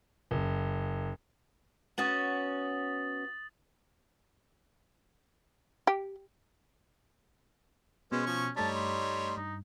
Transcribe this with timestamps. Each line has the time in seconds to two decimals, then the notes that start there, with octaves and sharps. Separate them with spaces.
0.31 F#1
1.98 B3 C#4 F#4 D#6 A6 F#7
5.87 G4
8.12 B2 G#3 B3 C#4 C5
8.26 F3 C#6
8.57 G2 G3 A3 D#4 C#5 A5 B6
8.75 C6
9.37 G2 D#4